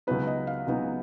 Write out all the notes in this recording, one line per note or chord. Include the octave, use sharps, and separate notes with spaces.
C#2 C#3 F#3 B3 D#4 B4
D#5
F5
C#2 C#3 F#3 B3 D#4